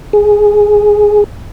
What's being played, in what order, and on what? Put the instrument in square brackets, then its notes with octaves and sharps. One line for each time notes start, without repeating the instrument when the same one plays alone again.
[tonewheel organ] G#4